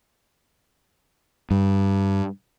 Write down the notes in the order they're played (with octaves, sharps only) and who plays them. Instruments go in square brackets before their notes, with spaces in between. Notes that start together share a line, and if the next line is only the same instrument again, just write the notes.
[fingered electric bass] G2